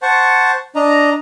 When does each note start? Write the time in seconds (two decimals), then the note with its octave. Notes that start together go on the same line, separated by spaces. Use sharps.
0.02 C5 F#5 A5 C#6
0.76 D4 D#5 A#5